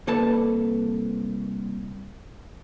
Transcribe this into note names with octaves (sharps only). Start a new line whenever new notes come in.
C2 A#3 A4 B4 A5